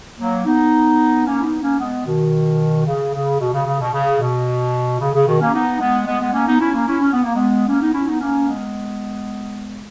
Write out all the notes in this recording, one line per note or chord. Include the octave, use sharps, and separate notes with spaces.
F#3 A#3
B3 D#4
A#3 C#4
E4
B3 D#4
A#3 C#4
G#3 B3
B2 D#3
C#3
C#3
B2
C#3
C#3
B2
C#3
B2
C#3
C#3
B2 D#3
A#3 C#4
B3 D#4
G#3 B3
G#3 B3
G#3 B3
A#3 C#4
B3 D#4
C#4 E4
A#3 C#4
C#4 E4
C#4
B3
A#3
G#3 B3
A#3 C#4
B3 D#4
C#4 E4
B3 D#4
A#3 C#4
G#3 B3